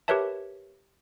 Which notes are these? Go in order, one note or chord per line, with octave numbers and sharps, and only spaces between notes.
G4 A#4 B4 C#5 E5 A5